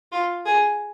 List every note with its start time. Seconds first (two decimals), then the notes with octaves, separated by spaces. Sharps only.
0.12 F4
0.46 G#4